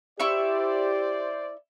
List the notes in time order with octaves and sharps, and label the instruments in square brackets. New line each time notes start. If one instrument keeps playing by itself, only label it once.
[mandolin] E4 E5 C#6 [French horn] G4 [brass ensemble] C5 D5